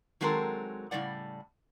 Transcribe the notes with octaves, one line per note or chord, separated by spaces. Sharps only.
D#3 F#3 G#3 C4 A4 A#4
A2 C#3 G3 D5 F#5